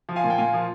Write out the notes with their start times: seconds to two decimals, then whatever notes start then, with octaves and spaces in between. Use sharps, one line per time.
0.09 F3
0.16 F5 G#5
0.24 A#2
0.30 G5
0.38 A#2 F5 G#5
0.53 F3